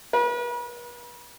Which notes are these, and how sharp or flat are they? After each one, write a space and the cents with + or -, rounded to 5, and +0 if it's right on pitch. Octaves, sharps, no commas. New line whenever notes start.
B4 -40